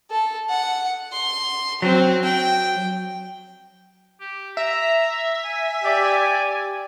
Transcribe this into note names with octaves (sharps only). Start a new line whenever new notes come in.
A4
F#5
C6
F#3 C4
G5
G4
E5 A#5
G#5
G4 D5